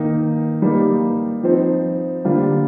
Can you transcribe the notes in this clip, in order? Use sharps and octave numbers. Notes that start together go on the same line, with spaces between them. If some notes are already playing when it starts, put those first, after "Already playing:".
Already playing: D#3 A#3 D#4
G3 A#3 D#4
F3 C4 D#4
D3 G3 A#3 F4